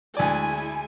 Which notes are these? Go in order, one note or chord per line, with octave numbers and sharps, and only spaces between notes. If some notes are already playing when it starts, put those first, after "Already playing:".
D2 G#3 E4 D5 G#5